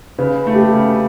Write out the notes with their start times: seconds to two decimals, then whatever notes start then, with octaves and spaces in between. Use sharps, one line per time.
0.19 C#3 B4
0.47 A3
0.54 G4
0.60 A4
0.73 C#3